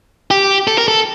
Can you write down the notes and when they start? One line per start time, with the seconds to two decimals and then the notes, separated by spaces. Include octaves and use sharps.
0.31 G4
0.67 A4
0.78 A#4
0.88 A4